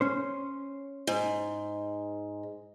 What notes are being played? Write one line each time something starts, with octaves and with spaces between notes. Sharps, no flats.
C#4 C5
G#2